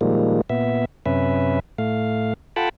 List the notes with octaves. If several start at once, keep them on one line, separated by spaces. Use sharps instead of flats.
A#2 D#3 F3 G3 G#3 A#3
A#2 B3 E5
F#2 C3 C#4 B4 E5
A2 A3 F5
F4 A4 F#5 G5 A5 B5